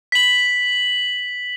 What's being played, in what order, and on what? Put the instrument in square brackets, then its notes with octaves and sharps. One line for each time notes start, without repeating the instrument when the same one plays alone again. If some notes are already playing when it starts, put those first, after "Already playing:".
[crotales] B6 F#7